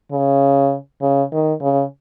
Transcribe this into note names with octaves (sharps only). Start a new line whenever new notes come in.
C#3
C#3
D#3
C#3